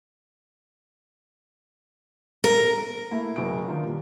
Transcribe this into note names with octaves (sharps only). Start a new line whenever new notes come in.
A#4
A3 A#3 E4
F#1 F#3 F#4 D7
D#3 D4 D#4 F4
A#2 G3